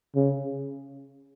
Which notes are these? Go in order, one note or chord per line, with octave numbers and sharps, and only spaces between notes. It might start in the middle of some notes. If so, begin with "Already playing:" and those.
C#3